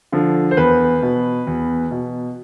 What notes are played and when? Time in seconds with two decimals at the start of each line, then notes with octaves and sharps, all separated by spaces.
0.12 D3 F3
0.51 C5
0.57 E2 B4
1.02 B2
1.47 E2
1.91 B2